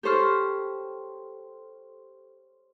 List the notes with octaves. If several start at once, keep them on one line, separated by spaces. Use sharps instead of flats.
G4 A4 C5 C#5 F6